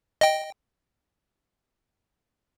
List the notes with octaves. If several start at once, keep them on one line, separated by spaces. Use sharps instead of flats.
D#5 G5